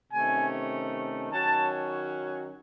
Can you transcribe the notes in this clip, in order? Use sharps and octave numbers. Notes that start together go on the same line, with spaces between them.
C3 D#3 A3 C#4 G#5
D#3 F#3 C#4 A5